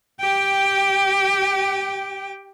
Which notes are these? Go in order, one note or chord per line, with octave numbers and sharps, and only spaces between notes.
G4 G5